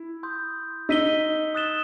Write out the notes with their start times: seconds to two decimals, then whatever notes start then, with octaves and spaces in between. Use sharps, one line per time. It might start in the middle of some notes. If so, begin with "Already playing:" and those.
Already playing: E4
0.23 C6 D#6 G6
0.89 D#4 E6 B6 D#7 G7
1.55 D#6 F#6 A6 E7 G7